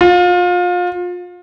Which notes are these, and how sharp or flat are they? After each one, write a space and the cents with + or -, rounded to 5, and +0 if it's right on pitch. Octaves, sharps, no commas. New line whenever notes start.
F4 +30